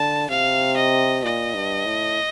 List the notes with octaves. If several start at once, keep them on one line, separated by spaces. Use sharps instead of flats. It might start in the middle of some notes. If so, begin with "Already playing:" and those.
Already playing: D3 A5
C3 F5
D#5
A#2 D#5
G2
A2